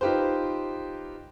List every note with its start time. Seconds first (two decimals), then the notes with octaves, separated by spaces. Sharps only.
0.01 D#4 F4 G4 B4 C5